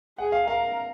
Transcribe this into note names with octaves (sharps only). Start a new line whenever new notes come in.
G#4 F#5
F5
A#4 F5